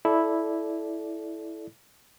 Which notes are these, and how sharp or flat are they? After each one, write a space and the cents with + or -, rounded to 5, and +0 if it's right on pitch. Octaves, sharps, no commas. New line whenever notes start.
E4 +0 A4 -20 D5 +0